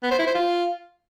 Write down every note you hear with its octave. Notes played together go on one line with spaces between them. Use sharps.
B3
C5
E4
C5
F4